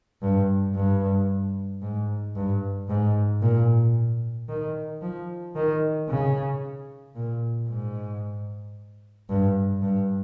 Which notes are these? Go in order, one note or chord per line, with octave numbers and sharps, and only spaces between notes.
G2
G2
G#2
G2
G#2
A#2
D#3
F3
D#3
C#3
A#2
G#2
G2
G2